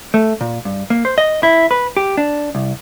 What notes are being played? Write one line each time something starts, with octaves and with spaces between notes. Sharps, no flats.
A3
A#2
G2
A#3
C5
D#5
E4
B4
G4
D4
C2